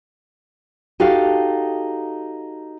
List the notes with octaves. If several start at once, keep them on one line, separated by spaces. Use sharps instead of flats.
D#4 F#4 G4 A4 F5